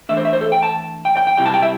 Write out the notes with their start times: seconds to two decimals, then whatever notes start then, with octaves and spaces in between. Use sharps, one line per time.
0.09 E3 A3 D4 E5
0.17 C5
0.25 E5
0.33 C5
0.41 A4
0.52 G5
0.63 A5
1.05 G5
1.17 G5
1.27 G5
1.37 C3 G3 E4 G5
1.46 A5
1.54 G5
1.62 E5